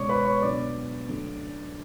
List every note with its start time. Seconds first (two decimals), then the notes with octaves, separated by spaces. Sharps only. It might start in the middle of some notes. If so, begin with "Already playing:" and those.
Already playing: C#2 B2 G#3 C#5 D5 C#6 D6
0.09 B4 B5
0.25 C#5 C#6
0.42 B2 F#3 B3 D4 D5 D6
1.08 D2 C#3 F#3 A3